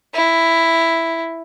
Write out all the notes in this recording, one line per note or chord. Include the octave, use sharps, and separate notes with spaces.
E4